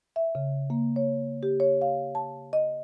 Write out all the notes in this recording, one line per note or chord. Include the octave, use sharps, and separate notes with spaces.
E5
C#3
A#3
C#5
G4
C#5
F5
A5
D#5